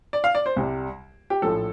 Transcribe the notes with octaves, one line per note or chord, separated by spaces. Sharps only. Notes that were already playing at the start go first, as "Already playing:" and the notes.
D5
F5
D5
C5
C2 C3 G3
G4
A#1 A2 F3 A4